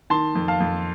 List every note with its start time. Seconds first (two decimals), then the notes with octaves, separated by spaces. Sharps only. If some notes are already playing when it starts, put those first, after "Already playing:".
0.10 D#3 A5 C6
0.35 F2
0.48 F5 A5
0.60 F2